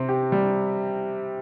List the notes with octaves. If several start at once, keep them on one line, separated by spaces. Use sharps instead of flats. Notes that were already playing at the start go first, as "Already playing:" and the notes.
Already playing: C3 C4
G4
G3